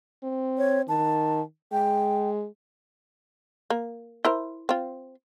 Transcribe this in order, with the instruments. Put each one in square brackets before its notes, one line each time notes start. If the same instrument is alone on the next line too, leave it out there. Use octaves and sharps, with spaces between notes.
[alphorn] C4
[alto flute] C#5
[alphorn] D#3 [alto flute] A5
[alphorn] G#3 [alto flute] G5
[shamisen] A#3
E4 A#4 C5
C4 F4